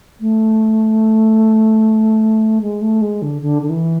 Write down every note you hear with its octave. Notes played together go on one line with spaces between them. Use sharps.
A3
G#3
A3
G#3
D3
D3
D3
E3